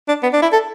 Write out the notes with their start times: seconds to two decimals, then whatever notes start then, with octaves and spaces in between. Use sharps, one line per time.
0.08 D4
0.23 B3
0.33 D4
0.42 E4
0.52 A4